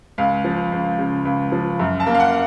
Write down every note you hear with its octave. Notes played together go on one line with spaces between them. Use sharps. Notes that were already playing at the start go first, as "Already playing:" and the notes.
C#2 F5
F3
C#2
C#3
C#2
F3
F#2
A5
A#3
F5
F#5